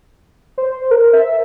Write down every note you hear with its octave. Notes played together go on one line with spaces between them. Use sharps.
C5
A#4
E5